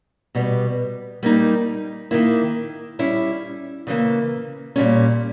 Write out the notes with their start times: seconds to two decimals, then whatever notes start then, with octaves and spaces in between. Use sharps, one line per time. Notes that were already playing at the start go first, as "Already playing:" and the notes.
0.35 B2 G3 B3
1.23 G3 A#3 D#4
2.11 D#3 A#3 E4
2.99 G3 C#4 E4
3.87 C#3 E3 G3 A#3
4.76 A#2 G3 C#4